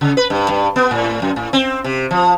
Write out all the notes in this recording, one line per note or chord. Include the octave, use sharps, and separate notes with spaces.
C#3
B4
G2
G2
B3
A2
F#2
A2
C4
C3
F3